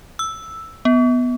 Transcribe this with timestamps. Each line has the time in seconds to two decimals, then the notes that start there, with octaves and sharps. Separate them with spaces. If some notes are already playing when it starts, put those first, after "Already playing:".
0.19 E6
0.85 B3